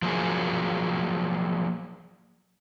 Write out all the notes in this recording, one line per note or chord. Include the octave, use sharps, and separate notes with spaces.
F3 F#3 A#3 G#4